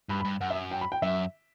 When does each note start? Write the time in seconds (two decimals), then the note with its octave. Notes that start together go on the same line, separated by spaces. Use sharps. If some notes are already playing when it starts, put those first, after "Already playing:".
0.09 G2 B5
0.20 B5
0.25 G2
0.41 F#2 F#5
0.50 E5
0.71 G5
0.81 B5
0.92 G5
1.02 F#2 E5